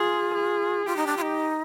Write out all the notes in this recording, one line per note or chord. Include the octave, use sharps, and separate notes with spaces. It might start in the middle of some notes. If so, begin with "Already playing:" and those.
Already playing: F4 G#4
G#4
F4 G4
D#4
D4
F4
D#4